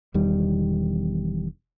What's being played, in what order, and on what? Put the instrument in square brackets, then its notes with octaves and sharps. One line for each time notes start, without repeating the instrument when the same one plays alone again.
[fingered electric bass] E1 E2 D#3 G3